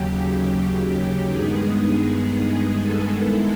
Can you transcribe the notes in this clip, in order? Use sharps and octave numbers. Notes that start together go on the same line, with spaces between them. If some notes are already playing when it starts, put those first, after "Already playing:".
Already playing: D#2 C#3 F#3 G4
G2 D#3 G#3 B3 G#4
A4
D#3 G#3 B3 E4